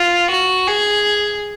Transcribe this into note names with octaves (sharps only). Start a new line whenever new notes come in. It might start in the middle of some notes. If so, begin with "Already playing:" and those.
Already playing: F4
F#4
G#4